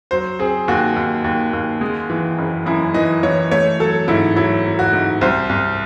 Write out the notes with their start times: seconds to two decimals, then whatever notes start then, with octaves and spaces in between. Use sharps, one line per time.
0.11 F#3 C5
0.39 C4 G#4
0.68 D#2 F#4
0.96 D#2
1.24 D#2
1.53 D#2
1.81 G#3
2.10 E3
2.38 F#1
2.66 F#2 E4
2.94 E3 D#5
3.23 E3 C#5
3.51 A3 C#5
3.79 F#3 A4
4.08 G#2 E4
4.37 F#3 E4
4.64 F#3
4.79 F#4
4.93 G#2
5.21 C2 C5
5.49 C2